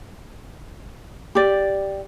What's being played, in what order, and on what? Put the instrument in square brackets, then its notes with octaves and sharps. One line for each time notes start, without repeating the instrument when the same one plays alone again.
[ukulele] G4 D5